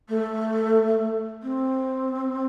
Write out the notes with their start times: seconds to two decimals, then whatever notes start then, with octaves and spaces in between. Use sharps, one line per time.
0.09 A3
1.43 C4